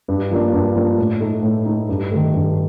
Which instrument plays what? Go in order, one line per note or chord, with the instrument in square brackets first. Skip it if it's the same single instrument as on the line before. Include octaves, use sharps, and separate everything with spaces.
[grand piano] G2
F3 A#3 D4
G2
F3 A#3 D4
A2
A3 D#4
A2
A3 D#4
G2
D#3 A3
G2